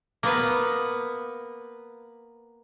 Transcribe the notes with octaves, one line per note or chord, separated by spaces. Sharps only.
A#3 B3 B4